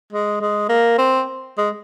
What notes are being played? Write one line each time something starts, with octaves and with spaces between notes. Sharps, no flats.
G#3
G#3
A#3
C4
G#3